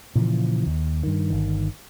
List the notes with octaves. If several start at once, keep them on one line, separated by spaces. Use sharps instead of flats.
A#2 C#3 E3 F3
D#2
G2 D#3
G1 D#3